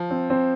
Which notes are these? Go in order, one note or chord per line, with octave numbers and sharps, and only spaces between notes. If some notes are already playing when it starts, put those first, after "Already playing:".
Already playing: F3
C4
C4